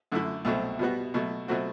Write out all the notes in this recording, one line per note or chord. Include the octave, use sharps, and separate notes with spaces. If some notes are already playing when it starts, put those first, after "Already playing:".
F#2 D3 A3 E4
C2 B2 F#3 A3 C4
B2 G3 B3 F#4
B2 F#3 A3
B2 F#3 A3 C4 F#4